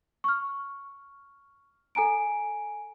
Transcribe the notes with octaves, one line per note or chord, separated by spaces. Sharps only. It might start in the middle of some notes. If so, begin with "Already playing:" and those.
C#6 F6
A4 G#5 A#5 D7